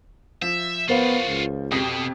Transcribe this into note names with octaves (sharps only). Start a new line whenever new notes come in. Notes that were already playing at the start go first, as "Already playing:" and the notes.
F3 E5
B3 F4 F#4 A#4 C5 F5
C#2
F2 B2 G4 D#6